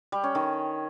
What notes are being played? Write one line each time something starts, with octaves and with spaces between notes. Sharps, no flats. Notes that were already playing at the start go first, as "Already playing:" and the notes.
G3
C#4
D#3